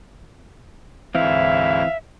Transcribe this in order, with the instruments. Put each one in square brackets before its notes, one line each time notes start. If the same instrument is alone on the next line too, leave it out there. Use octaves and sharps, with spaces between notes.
[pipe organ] D2 G#2 E4 [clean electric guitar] E3 C4 [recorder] E5 [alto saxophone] F5